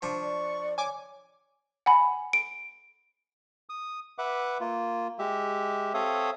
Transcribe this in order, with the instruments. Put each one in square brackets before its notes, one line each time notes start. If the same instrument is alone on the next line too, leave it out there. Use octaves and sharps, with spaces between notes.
[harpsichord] F3 D4 [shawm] C#6
[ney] D5
[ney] C#5 [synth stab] G#5 D6
[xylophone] F#5 G#5 B5
D7
[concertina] D#6
B4 E5 F#5 D6
A#3 F4
G#3 G4 E5
C4 A4 C#5 E5 F5 D#6